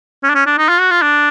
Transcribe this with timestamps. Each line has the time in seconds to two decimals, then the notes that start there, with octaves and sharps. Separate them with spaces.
0.24 C#4
0.30 D4
0.35 C#4
0.47 D4
0.58 D#4
0.69 F4
0.80 F#4
0.91 F4
1.02 D4